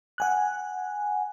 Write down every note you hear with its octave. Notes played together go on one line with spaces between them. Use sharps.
F#5 G#5 F#6